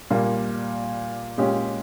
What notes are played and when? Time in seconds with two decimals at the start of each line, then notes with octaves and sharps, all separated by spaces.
0.10 A#2 G3 A#3
1.38 A#2 G#3 C#4 G4